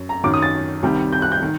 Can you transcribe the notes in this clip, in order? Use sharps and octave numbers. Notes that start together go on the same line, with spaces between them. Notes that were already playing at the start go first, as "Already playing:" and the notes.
Already playing: F#2
A#5
F#2 D#3 F#3 D6
D#6
A6
C2 C3 D#3 G3
G6
F#6
G6
D#3